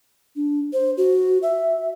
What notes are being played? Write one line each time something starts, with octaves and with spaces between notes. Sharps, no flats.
D4
C5
F#4
E5